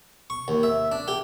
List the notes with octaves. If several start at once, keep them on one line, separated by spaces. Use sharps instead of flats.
C#6
D#2
E5
D4
G4